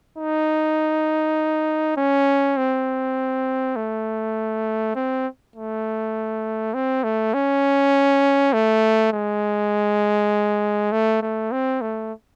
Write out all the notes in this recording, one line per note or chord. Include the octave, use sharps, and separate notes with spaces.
D#4
C#4
C4
A3
C4
A3
C4
A3
C#4
A3
G#3
A3
A3
C4
A3